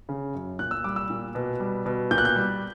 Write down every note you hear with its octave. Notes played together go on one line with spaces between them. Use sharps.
C#3
F#2
A#2 F#6
E6
G3 D6
E6
A#2
B2
G3
B2
A#2 G6
F#6
G6
G3